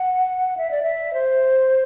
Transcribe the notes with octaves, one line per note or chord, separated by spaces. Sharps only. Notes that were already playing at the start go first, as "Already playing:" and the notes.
Already playing: F#5
E5
D5
E5
C5